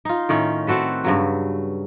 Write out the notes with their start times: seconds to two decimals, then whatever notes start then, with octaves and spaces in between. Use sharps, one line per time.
0.05 D#4 F4
0.29 A2 D#3 C#4
0.67 C4 F#4 A4 B4
1.04 G2 C#3 F#3